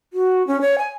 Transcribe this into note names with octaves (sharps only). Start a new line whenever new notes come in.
F#4
C#4
C#5
G#5